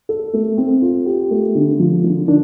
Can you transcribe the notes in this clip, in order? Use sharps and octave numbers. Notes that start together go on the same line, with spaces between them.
A4
A3
C4
F4
G4
A3
D3
F3
D3
D4